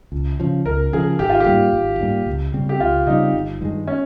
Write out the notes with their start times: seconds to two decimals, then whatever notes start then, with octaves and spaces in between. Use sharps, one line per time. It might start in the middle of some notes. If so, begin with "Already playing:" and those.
0.12 C#2
0.40 C#3 F3
0.66 C#2 A#4
0.93 C#3 F3 G#4
1.19 G#1 G4
1.30 F4
1.40 G4
1.46 G#2 G3 A#3
1.73 G#1
1.99 G#2 G3 A#3
2.26 C#2
2.54 C#3 G3 C4
2.69 G4
2.80 C#2 F4
3.07 C#3 G3 C4 D#4
3.33 G1
3.61 G2 D#3 G#3
3.87 C#4